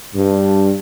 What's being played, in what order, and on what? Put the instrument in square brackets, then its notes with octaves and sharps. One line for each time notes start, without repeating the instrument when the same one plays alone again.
[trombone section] G2